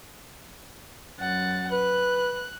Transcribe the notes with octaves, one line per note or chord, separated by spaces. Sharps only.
F#2 F#5 A6
B4 F#6